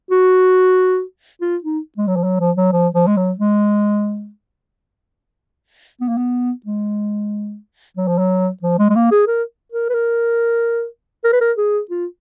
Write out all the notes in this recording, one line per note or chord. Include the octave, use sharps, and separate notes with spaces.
F#4
F4
D#4
G#3
F#3
F3
F#3
F3
F#3
F3
F3
G#3
F#3
G#3
B3
A#3
B3
G#3
F#3
F3
F#3
F3
G#3
G#3
A#3
G#4
A#4
A#4
B4
A#4
A#4
B4
A#4
G#4
F4